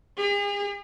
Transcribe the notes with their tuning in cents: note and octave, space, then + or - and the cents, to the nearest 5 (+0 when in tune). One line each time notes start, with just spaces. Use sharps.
G#4 -45